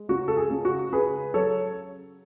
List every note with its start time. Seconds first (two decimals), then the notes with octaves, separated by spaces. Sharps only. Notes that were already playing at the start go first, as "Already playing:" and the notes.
Already playing: G#3
0.09 C#2 F#4
0.28 A4
0.37 G#4
0.50 C#2
0.65 F#4
0.92 C#3 G#4 B4
1.34 F#3 A4 C#5